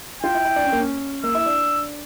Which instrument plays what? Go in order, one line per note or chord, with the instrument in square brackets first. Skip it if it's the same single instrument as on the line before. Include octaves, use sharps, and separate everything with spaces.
[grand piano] F4 [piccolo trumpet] G5
[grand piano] E4
E4
D4
C#4
A#3
C#4
[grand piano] A#3 [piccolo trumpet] E6
[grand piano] E4
D4